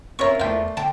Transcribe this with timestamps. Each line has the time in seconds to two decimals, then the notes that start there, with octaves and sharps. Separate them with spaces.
0.19 A#3 C4 C#4 E4 F4 A#4 C#5 C#6
0.40 E2 A3 D4 C5 F5 G5
0.77 D3 G5 A5